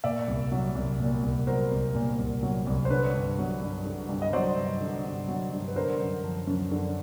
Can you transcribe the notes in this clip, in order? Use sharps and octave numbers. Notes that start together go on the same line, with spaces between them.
A#2 D5 E5
C2
F#3
C2
A#2
C2
F#3 A#4 C5
C2
A#2
C2
F#3
C2
C5
D3 B4 C#5
G2
F#3
G2
D3
G2
D#5
F#3 C5 D5
G2
D3
G2
F#3
G2
B4
D3 A#4 C5
F#2
F3
F#2
D3